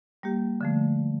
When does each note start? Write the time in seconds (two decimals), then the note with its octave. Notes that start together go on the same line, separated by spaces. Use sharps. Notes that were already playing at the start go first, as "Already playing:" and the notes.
0.23 G3 A#3 G4
0.61 D3 F3 A3